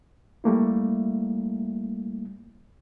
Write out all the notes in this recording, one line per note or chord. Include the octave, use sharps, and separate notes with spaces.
G3 A3 A#3 E4